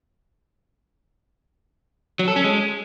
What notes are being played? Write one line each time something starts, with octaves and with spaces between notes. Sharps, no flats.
F#3
A4
C#4
G#3